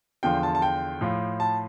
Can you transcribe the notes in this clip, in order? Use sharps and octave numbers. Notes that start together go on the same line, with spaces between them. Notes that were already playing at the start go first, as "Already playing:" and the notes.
E2 D3 F3 G5
A5
A5
G5
A2 F3
A5